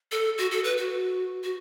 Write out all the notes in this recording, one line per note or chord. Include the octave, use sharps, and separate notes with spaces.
A4
F#4
A4
B4
F#4
F#4